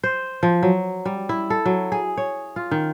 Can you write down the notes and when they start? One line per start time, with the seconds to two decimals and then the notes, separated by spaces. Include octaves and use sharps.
0.04 C5
0.43 F3
0.63 F#3
1.05 G3
1.29 E4
1.50 A4
1.66 F#3
1.92 G#4
2.17 C#5
2.56 F4
2.71 D#3